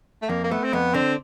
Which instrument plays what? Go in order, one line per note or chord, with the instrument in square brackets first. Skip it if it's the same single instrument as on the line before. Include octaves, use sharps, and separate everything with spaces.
[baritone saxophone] A3
[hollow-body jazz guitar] F2 [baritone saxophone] A#3
[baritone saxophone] A#3
[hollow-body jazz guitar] A3 [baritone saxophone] B3
[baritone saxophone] C4
[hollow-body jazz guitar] F2 [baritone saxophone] B3
[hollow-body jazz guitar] D3 [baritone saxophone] C4